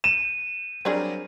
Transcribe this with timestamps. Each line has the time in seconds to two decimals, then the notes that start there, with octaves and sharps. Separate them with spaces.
0.04 D#7 E7
0.85 F#3 G3 C4 D4 G#4 A#4